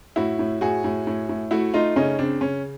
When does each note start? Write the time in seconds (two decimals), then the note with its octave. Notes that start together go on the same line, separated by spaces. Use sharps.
0.16 A2 E4 F#4
0.39 A2
0.61 A2 F#4 G#4
0.84 A2
1.07 A2
1.29 A2
1.51 A3 E4 F#4
1.74 A3 D#4 F4
1.96 C#3 C#4 D#4
2.19 C#3 C4 D4
2.41 C#3 C#4